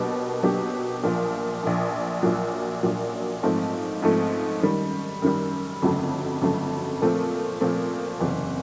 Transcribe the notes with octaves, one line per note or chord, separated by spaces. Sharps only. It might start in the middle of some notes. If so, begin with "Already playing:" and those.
Already playing: B2 F#3 A#3 D4 G4
B2 F#3 A#3 D4 G4
A#1 A#2 F3
A#1 A#2 F3
A#1 A#2 F#3
A#1 A#2 F#3
G#2 F3 A3 C4
G#2 F3 A3 C4
F#2 D#3 G3
F#2 D#3 G3
G1 F2 C#3 F#3 A3
G1 F2 C#3 F#3 A3
A#2 F3 A3 C4
A#2 F3 A3 C4
F#1 E2 C3